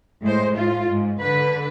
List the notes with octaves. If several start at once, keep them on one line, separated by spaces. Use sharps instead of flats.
A2 G#3 C5
A2 F4
G#2
D3 B4